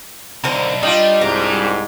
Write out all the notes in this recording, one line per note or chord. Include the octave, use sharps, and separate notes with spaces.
B1 D3 A#4 C5
G3 D4 D#4 F4
C2 G#2 A#5